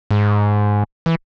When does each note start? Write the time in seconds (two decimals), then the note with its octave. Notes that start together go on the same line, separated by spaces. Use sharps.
0.11 G#2
1.06 E3